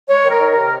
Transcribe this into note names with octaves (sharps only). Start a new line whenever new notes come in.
G#3 C#5
D#3
A#4
D#3
A#4
C3